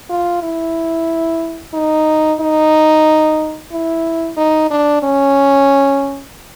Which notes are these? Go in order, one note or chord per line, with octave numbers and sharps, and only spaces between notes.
F4
E4
D#4
D#4
E4
D#4
D4
C#4